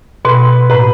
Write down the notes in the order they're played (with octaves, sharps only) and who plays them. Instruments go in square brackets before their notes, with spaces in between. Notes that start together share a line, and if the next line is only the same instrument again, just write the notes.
[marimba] B2 [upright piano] B4
[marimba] A2 [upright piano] B4